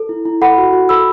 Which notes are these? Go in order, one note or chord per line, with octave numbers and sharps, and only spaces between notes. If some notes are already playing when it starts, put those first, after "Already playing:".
Already playing: A4
E4
E4
A4 F#5 B5
F#4
F#4
A4 B5 E6